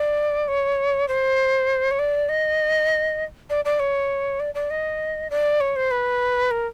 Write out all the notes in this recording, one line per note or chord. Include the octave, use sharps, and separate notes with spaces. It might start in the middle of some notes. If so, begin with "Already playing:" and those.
Already playing: D5
C#5
C5
C#5
D5
D#5
D5
D5
C#5
D5
D5
D#5
D5
C#5
C5
B4
A#4